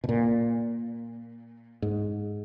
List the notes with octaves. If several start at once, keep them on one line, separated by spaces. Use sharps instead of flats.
B2
A#2
G#2